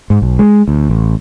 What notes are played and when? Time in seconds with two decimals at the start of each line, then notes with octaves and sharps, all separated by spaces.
0.10 G#2
0.22 B1
0.39 G#3
0.68 D2
0.90 A1